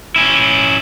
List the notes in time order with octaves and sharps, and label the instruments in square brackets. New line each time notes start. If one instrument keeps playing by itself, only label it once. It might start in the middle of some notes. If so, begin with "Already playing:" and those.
[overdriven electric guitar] C#4 E4